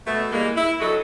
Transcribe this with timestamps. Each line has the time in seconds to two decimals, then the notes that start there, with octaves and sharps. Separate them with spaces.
0.06 B2 A3
0.32 E3 G3 G#3 A#3
0.57 E4
0.80 D2 F#3 F#4 A4 D#5